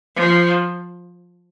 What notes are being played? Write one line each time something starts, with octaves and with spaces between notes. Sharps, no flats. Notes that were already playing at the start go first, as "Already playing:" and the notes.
F3